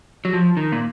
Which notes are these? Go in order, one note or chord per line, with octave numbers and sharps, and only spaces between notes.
F#3
F3
D#3
A#2